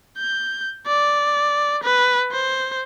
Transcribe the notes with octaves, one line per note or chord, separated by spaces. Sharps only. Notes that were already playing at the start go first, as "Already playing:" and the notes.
G6
D5
B4
C5